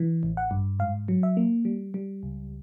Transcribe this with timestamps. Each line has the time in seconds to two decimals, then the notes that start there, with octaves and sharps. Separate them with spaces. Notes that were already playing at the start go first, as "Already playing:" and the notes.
Already playing: E3
0.23 A1
0.37 F#5
0.51 G2
0.79 G#2 F5
1.08 F#3
1.23 E5
1.37 A#3
1.65 G3
1.94 G3
2.23 C#2